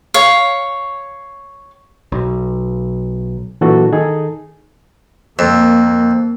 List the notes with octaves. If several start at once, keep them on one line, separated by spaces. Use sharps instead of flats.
C#5 F5
B1
A#2 E3 F#3 D4 F#4 A4
D#3 D#4 G#4 A4
F2 A#3